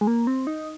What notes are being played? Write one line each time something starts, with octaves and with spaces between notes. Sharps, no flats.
G#3
A#3
C4
D#4